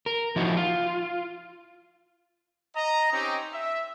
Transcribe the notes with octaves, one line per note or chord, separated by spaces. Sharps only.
A#4
F3 D#4 E4 F#4
F4
D#5 A#5
C4 C#4 D#4 G4
E5